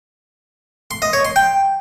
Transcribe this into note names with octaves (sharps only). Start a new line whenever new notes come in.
C6
D#5
C#5
C6
G5